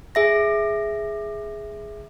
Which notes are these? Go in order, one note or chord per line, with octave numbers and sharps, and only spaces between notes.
G#4 E5 A#6